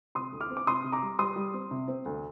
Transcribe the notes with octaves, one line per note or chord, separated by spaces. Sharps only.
C3 C6 D#6
D2
D6 F6
C4
D6
C3 C6 D#6
C3
A#5 D6
G3
G3 C6 D#6
G3
C4
C3
C4
D2